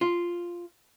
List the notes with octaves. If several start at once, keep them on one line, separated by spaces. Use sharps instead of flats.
F4